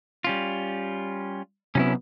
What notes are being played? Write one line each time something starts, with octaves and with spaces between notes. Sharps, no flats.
G3 C#4 F4
C3 F#3 B3 C#4 D#4 E4